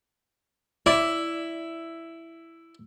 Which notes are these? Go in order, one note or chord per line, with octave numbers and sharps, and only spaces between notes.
E4 D5